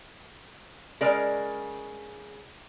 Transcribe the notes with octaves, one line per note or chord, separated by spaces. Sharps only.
C#3 G#3 A#4 D5